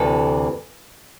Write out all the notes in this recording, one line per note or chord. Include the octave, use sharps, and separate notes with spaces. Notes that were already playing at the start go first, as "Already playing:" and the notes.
Already playing: D2 C3 E3 A4